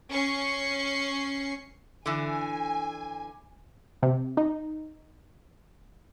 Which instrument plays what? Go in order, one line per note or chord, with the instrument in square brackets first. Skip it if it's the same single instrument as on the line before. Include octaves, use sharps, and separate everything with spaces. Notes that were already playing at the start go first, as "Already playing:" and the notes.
[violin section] C#4 C#6 C7
[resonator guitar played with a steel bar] D3 E3 [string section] G#5
[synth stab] C3
D#4